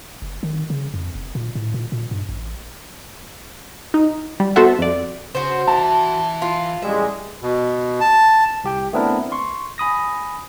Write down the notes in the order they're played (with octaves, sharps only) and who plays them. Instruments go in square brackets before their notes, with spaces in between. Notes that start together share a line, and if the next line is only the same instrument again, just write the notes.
[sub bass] F#1
D#3
C#3
F2
F1
A#2
A2
A#2
A#2
G2
A1
[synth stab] D#4
G3
B3 F#4 A4 C5 E5 F#5
F2 D5
[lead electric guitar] C#3 [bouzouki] F#4 C5
[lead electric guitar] E3 E5 [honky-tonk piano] A5
[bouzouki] F4
[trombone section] A1 G3 G#3 [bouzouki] E5
[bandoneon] B2
A5
[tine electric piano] C2 G4 G5
A3 B3 C4 D4 E4 A#4
C6 C#6
G#5 B5 D#6 A#6